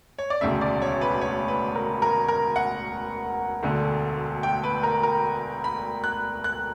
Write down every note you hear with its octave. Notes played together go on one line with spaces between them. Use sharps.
C#5
D5
E1 D2 C#3 E5
D5
C#5
B4
C#5
B4
A#4
A#4
A#4
F#5
E1 D2 D3
G5
B4
A#4
A#4
B5
F#6
F#6